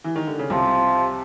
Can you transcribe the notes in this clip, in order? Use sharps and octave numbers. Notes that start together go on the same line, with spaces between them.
E3
D#3
D3
C#3
C2 C3 F3